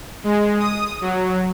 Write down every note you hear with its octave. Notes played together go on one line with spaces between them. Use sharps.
G#3
D#6
F#3